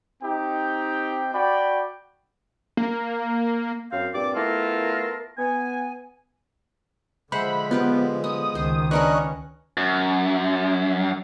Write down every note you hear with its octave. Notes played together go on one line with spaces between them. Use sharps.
C4 D#4 G4 G5
F#4 D5 G5 B5
A#3
F#2 C4 F5
G2 A#2 C4 D5 D6
A3 B3 E4 F4 A4 A#4
B3 G#5
D3 F3 G#3 C5 E5 F#5 B5
B3 F4 G4 B4
B3 D#6
C#2 D#3 C5
C#4 D4 A#4 B4 D#5 C#6 F#6
F#2